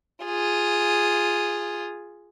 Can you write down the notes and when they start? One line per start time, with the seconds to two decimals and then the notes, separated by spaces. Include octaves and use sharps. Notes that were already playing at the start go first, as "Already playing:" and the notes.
0.24 F4 G#4